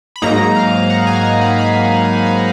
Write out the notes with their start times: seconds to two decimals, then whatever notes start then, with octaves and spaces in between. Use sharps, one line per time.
0.16 B5
0.22 G#2 F#3 A#3 D#4 A#5
0.56 F5
0.90 F#5
1.07 G#5
1.24 A#5
1.41 B5
1.58 B5
2.26 A#5